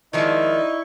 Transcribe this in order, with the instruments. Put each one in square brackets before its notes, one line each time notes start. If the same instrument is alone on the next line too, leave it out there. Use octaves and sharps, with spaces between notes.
[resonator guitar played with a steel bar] D#3 F3 G#3 [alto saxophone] D#4 [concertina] E4 C#6 [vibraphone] D5